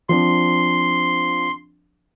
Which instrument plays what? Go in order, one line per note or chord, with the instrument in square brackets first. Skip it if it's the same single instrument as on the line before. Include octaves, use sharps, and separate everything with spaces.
[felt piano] F3 C4 D4 [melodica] C6